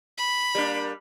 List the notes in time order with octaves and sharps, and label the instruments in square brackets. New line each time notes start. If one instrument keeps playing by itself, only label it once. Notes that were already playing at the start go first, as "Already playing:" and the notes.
[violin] B5
[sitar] G3 A#3 D4